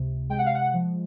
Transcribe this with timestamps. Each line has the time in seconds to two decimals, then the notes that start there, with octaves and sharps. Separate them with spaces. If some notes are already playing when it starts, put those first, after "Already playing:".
Already playing: C#2 C3
0.29 G#3 G5
0.39 F#5
0.46 F5
0.55 F#5
0.74 F3